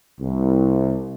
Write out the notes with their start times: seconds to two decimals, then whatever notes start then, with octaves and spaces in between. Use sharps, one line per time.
0.20 C2